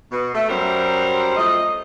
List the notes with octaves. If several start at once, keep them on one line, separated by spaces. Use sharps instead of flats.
B2
A3
F#2 F#3 G3 A#4 C5
F3 A3 D#5